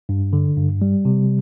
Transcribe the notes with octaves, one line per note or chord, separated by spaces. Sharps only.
G2
D3
G2
G3
C3